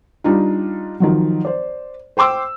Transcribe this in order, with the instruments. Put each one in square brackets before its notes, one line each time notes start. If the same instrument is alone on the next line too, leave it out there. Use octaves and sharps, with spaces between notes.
[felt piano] G3 D4 D#4 F4
D#3 F3 F#3
C5 D5
C5 G5 C6 D6 E6